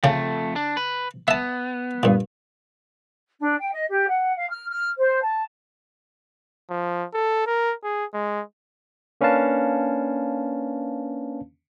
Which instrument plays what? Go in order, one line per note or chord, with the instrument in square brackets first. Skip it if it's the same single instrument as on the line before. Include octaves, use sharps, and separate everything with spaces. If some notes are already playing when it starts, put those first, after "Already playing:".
[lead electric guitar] F2 A3 [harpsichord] C#3 G5
[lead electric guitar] D4
B4
[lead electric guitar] B3 [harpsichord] E5 A5
[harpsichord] G2 A#2
[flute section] D4
G5
D#5
G4
F#5
F5
F6
F6
C5
A5
[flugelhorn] F3
A4
A#4
G#4
G#3
[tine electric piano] A#3 C#4 D4 B4 F5 A5